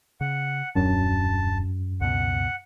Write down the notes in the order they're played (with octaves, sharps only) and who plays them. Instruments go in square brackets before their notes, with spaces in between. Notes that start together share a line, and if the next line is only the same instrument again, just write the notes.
[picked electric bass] C#3 [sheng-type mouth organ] F#5
[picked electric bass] D#1 D4 [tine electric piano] F#2 [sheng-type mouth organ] A5
[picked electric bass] C#2 B2 [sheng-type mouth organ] F#5